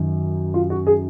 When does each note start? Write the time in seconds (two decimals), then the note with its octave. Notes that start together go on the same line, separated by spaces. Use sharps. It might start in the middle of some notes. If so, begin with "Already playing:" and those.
Already playing: F#2 D#3
0.54 F4
0.70 F#4
0.87 G#4